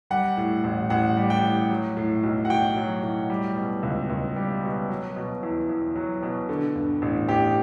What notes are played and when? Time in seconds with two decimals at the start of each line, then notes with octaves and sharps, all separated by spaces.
0.10 G3 F#5
0.37 A2
0.64 A1
0.90 A1 F#5
1.17 G3
1.30 G5
1.43 A2
1.70 F#3
1.97 A2
2.23 B1
2.45 F#5
2.50 B1 G5
2.76 F#3
3.03 A2
3.30 G3
3.57 B2
3.83 C#2
4.10 C#2
4.36 G3
4.63 B2
4.89 F#3
5.16 B2
5.43 E2
5.69 E2
5.96 F#3
6.23 B2
6.49 D3
6.75 G2
7.02 A1
7.29 A1 G4